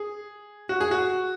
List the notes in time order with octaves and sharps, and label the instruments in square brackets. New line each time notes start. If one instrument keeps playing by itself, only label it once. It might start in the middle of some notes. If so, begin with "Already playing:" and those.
Already playing: [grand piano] G#4
F#4
G#4
F#4